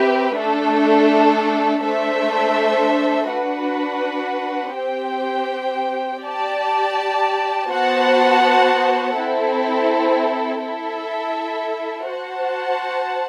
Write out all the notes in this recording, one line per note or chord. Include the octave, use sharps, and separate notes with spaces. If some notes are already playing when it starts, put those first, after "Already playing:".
Already playing: C4 G4 B4 E5
A3 D4 A4
A3 D4 A4 C5 E5
D4 F#4 B4 F#5
C4 G4 C5 G5
G4 D5 A5
B3 F#4 C5 F#5 A5
C4 E4 A4
E4 A4 E5
F#4 C5 F#5 A5